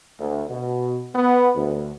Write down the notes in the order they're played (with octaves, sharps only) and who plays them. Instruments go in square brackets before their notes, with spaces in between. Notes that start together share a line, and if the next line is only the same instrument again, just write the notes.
[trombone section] D2
B2
B3
D2